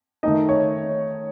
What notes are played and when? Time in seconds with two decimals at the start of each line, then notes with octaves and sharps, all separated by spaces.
0.23 D#3 A3 D#4 D#5
0.49 C#5